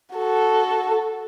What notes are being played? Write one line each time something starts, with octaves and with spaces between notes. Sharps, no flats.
F#4 A4